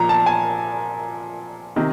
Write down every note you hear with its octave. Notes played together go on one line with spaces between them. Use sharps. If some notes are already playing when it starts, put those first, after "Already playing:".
Already playing: A#2 F3 A#5
A5
G#5
C3 D#3